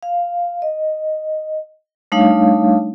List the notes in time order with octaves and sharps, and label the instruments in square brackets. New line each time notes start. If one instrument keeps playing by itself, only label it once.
[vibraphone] F5
D#5
G3 A3 D4 D#4 C#5 F5